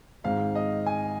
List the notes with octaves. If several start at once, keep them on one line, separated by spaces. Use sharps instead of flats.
G#1 G#2 D#3 G#3 C4 F5
D#5
G#5